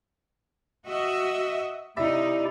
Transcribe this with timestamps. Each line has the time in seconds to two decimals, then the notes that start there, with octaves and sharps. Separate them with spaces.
0.88 F#4 D#5 E5
1.97 C3 D#4 E4 G4 D5 E5